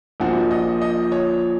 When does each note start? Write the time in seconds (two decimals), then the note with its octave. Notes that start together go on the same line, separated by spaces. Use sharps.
0.20 A#1 A#2 F3 F#4
0.51 D#5
0.82 D#5
1.12 C#5